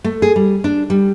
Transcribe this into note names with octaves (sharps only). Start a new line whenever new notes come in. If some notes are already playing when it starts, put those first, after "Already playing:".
A3
G#4
G3
D4
G3